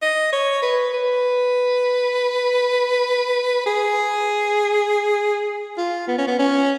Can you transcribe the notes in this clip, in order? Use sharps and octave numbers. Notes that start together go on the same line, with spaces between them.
D#5
C#5
B4
B4
G#4
F4
B3
C#4
B3
C#4